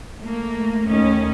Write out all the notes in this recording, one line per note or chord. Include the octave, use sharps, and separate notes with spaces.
A3 A#3
D#2 A3 C#4 D#5